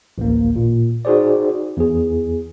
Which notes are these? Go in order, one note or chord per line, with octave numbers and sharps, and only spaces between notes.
A1 D2 A#3
A#2
D#4 F#4 G#4 C5 D5
E2 G#4